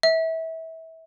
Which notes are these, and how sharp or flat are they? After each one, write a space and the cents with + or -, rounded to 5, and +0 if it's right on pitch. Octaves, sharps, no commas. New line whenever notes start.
E5 -25